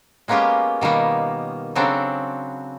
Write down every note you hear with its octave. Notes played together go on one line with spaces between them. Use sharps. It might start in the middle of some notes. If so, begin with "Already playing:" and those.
G#3 A#3 B3 C#4 F4 G4
B2 D#3 G3 A#3 B3
C#3 F#3 C4 D4 A4